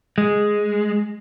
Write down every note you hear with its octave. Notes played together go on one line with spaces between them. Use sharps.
G#3